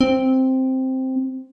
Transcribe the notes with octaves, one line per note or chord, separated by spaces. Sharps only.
C4